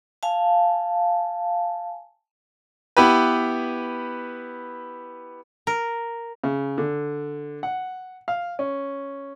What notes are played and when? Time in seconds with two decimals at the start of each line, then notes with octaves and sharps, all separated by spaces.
0.23 F5 G#5 A5
2.97 B3 E4 G4 B4
5.67 A#4
6.44 C#3
6.78 D3
7.63 F#5
8.28 F5
8.59 C#4